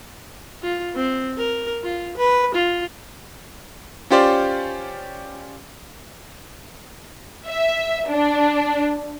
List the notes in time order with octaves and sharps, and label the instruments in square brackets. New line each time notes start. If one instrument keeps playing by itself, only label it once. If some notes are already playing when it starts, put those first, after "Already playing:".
[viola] F4
C4
A#4
F4
B4
F4
[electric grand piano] C#4 F4 G4 C5 D5
[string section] E5
D4